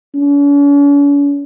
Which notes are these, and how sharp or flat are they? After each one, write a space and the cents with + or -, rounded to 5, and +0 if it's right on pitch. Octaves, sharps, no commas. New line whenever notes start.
C#4 +45